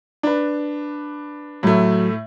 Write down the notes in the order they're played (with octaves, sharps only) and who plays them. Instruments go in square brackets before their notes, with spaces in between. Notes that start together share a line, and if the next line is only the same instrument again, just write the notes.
[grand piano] D4 B4
[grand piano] A2 A3 [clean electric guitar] F#3